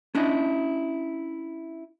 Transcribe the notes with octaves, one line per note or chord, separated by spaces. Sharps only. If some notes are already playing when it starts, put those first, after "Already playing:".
C#4 D4 E4 D#5